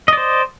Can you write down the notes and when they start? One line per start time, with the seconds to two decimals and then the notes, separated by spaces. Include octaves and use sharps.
0.08 D#5
0.13 D5
0.17 C5